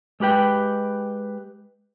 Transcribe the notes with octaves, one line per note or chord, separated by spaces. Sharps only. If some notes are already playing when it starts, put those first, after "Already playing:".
G#3 G4 B4 G5